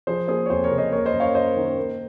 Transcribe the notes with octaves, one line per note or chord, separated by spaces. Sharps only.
F3 G#4 C5
A#3 G#4 C5
C#5
F2 G#4 C5
A#4 C#5
C#3
C5 D#5
A#3 A#4 C#5
C5 D#5
F#2
C#5 F5
F#2 C5 D#5
D#3
A#3